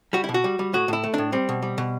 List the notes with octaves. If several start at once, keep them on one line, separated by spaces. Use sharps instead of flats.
G3 F#4
E4
B2
F#4
G3
G3
A2 F#4
A2 E4
A3
A2 D4
G3 C4
B2
G3
B2